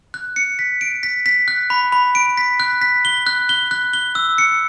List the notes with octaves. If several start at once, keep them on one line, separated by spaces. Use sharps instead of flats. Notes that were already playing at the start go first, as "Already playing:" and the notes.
F#6
C#7
B6
D7
B6
B6
F#6
B5
B5
D7
B6
F#6
B6
G7
F#6
G7
F#6
G7
E6
C#7